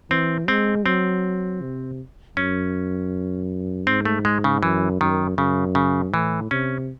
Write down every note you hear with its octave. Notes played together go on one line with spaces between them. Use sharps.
E3 C4
G#3 C4
F#3 C4
C3
F#2 C#4
G#2 C4
A3
G#3
C#3
F#2 E3
F#2 D#3
F#2 C#3
C#3
A2 E3
C3 C#4